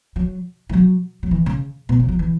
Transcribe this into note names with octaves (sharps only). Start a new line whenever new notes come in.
F#3
E3
F#3
F#3
E3
C#3
B2
C#3
F#3
E3